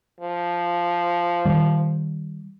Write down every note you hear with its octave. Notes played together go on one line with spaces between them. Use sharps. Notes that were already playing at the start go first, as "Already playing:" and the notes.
F3
D#3 G3